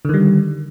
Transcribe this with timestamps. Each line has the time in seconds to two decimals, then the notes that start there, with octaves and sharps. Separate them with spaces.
0.05 D3
0.09 D#3
0.14 G3